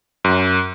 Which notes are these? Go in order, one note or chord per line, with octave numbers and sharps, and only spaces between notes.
F#2